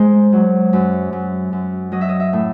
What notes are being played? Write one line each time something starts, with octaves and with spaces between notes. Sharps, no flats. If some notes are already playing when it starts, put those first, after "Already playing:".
Already playing: G#3 G#4 C5
F#3
F#2
F#2
F#2
F#3 D#5
E5
D#5
E5
A2